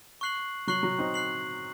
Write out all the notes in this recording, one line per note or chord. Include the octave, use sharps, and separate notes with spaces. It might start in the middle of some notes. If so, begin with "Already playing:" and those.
C#6 F#6 C7 F#7
F#3 C#6 F#6 C7 F#7
F#3
C4 D#4
F#6 C7 F#7